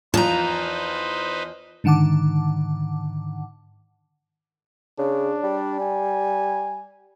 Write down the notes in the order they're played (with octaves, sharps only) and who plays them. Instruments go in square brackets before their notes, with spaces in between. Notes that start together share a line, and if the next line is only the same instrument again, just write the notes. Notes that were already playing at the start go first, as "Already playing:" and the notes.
[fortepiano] E2 F3 [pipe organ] D#4 B4 C5 [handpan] F4 [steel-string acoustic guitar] A5 A#5
[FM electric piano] G#2 D3 D#3 F#5 A5 D6
[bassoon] C#3 [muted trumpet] D4
[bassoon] G3
[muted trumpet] G#5